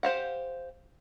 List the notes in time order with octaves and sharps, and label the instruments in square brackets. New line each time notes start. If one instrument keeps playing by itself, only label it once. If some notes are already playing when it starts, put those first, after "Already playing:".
[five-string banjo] G4 C5 F5 F#5